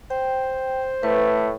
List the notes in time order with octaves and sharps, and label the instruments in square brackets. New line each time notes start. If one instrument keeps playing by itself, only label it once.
[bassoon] C5 [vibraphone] G5
[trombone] A2 [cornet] A3 [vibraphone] B4